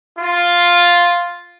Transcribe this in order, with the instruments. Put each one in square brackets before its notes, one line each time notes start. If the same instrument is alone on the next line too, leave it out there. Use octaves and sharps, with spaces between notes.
[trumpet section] F4